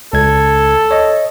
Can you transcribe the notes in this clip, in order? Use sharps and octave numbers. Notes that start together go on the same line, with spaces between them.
C#2 A4 G#6
C#5 D#5